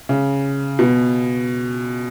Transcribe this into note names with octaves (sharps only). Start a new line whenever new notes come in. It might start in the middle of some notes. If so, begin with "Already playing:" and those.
C#3
B2